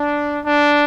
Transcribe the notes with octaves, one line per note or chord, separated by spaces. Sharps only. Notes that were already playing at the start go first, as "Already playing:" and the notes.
Already playing: D4
D4